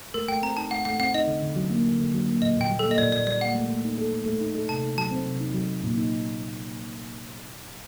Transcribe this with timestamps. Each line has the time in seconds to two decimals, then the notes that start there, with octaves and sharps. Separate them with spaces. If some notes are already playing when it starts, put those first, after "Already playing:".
0.14 A3 A#4
0.28 A3 G5
0.42 C4 A#5
0.57 D#4 A5
0.71 A3 F#5
0.85 A3 F#5
1.00 C4 F#5
1.14 D#4 D#5
1.28 D3
1.42 D3
1.56 F#3
1.70 A#3
1.85 D3
2.00 D3
2.14 F#3
2.28 A#3
2.42 A#2 D#5
2.56 A#2 G5
2.70 G3
2.79 A4
2.85 A#3
2.91 D#5
2.98 A#2 D5
3.12 A#2 D5
3.27 G3 D5
3.41 A#3 F#5
3.55 A3
3.70 A3
3.84 D#4
3.98 A4
4.12 A3
4.26 A3
4.41 D#4
4.55 A4
4.69 C3 A5
4.84 D#4
4.97 F#3 A5
5.11 C4
5.26 C3
5.40 D#4
5.54 F#3
5.69 C4
5.83 A#2
5.98 D#4